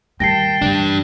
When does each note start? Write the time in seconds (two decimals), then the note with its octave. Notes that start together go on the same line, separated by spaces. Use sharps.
0.20 D#3 G3 G5 A5 A#6 C7
0.62 E3 G3 D4